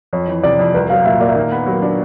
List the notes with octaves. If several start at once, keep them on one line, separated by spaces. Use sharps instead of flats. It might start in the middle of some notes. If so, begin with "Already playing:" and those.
F2 C#5
E3
C3 D5
F2
C2 B4
F#3 F5
A#2 E5
A#3 D5
E5
D#3 F5
B3
F#3
D4